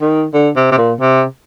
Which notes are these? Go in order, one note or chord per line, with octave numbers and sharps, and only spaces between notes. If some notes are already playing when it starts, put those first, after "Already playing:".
D#3
D3
C3
C3
A#2
C3